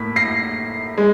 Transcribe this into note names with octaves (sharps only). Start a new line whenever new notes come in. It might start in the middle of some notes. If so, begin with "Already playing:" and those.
Already playing: A2 A#3 B6
A#6 C7
G#3